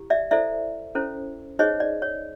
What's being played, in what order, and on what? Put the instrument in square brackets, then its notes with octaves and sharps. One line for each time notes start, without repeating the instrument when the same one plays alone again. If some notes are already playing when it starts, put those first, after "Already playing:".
Already playing: [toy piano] E4 G4
D5 E5
E4 A4 C5 D5 E5
C#4 E4 A4 C5
D#4 G#4 C5 C#5 D#5
D5
C#5